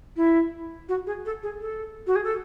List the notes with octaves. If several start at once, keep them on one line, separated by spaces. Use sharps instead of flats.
E4
F#4
G#4
A4
G#4
A4
F#4
G#4
A4